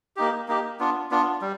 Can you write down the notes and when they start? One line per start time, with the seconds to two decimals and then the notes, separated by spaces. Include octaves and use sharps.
0.16 A#3 D#4 G4
0.48 A#3 D#4 G4
0.79 B3 D4 F4
1.11 B3 D4 F4
1.41 G3